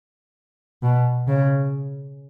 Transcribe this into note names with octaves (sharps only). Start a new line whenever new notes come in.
B2
C#3